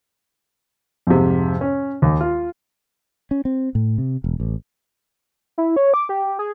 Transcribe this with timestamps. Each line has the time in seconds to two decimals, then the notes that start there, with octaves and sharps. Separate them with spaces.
1.07 F2 G#2 C3
1.61 C#4
2.02 D#2
2.21 F4
3.31 C#4
3.45 C4
3.75 A2
3.98 C3
4.24 E1
4.40 A1
5.58 E4
5.76 C#5
5.94 D6
6.09 G4
6.39 G#4